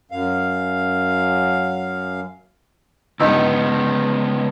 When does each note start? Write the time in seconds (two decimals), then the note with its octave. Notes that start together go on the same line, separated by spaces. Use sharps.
0.11 F#2 F5
3.20 C#2 G2 B3 D#4 E6